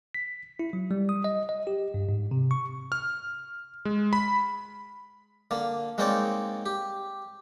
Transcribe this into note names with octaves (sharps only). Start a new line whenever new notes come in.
B6
E4
F#3
G3
D#6
D#5
D#5
G4
G2
G#2
C3
C#6
F6
G#3
B5
D3 A#3
G#3 A#3 C4 D#4 C#5 D5
G4